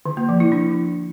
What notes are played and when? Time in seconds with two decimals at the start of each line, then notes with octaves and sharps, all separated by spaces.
0.06 D3
0.17 A#3
0.29 F3
0.40 E4
0.52 D4